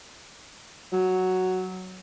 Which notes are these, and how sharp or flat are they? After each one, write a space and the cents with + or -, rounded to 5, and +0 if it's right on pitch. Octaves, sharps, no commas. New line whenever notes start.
F#3 +0